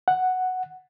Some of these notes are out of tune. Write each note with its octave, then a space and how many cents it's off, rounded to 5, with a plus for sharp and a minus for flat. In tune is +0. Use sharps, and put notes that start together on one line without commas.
F#5 +0